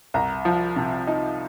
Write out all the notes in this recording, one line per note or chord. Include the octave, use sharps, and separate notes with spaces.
C2 A#5
F3
C3
D#4